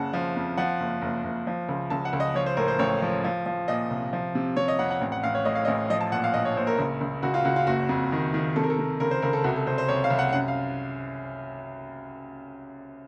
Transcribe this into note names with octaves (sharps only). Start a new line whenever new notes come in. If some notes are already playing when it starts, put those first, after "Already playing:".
Already playing: F#1 C#3 F#5 A5
F3
F2
F3 F#5
F#1
F#1
F#1
F3
C#2
C#2 A5
F#5
C#2
D#5
F3 C#5
C5
A2 A#4
C5
A1 C#5
F3
F3
F3
A#2 D#5
C2
F3
C3
C3 C#5
D#5
F2 F#5
F#5
A1
F#5
A1 F5
C#5
A2 D#5
F5
D#5
A1
F3 D#5
A5
A#2 F#5
F5
A#1 D#5
C#5
A#1 C5
A#4
C#2
C#2
C#2 F#4
F4
C#2 F#4
F4
F#1 F#4
F2
D#3
D#3
C3 A4
A#4
A4
C3
C#2 A#4
C5
C#2 A#4
A4
C2 F#4
A4
C2 C5
C5
C2 C#5
F5
C2
F#5
F#2 F#5
F5